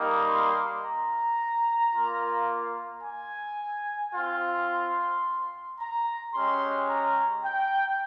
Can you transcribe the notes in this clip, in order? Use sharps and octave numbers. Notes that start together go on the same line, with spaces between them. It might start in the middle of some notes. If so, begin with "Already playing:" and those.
Already playing: G3 A#3 D#4
C6
A#5
A#3 F4
G#5
C4 F4
C6
A#5
G#3 C#4 G4 C6
A#5
G5